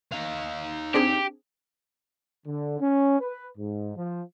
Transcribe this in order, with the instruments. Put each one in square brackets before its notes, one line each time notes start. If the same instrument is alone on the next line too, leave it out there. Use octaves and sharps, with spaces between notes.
[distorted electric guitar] D#4 F5
[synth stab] C4 D4 G#4 [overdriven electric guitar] G4
[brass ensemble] D3
C#4
B4
G#2
F3